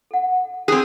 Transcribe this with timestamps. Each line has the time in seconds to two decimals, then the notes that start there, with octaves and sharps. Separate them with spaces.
0.11 A4 F#5
0.68 C4 G4 G#4